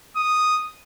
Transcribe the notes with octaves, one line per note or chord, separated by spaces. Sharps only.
D#6